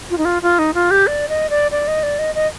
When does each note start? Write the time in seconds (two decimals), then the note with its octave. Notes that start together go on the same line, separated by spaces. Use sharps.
0.10 F4
0.18 D#4
0.25 F4
0.42 F4
0.59 D#4
0.74 F4
0.91 G4
1.07 D5
1.29 D#5
1.50 D5
1.71 D5
1.88 D#5
2.03 D5
2.19 D#5
2.35 D#5